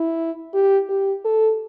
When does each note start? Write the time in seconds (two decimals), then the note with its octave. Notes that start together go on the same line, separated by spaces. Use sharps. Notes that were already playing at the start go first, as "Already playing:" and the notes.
Already playing: E4
0.54 G4
0.89 G4
1.25 A4